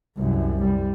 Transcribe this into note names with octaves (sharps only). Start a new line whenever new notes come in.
C2 F#2
G3